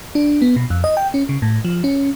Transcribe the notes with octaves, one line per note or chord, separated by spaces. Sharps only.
D4
B3
B2
F2
D#5
G5
C#4
C#3
A2
F3
C#4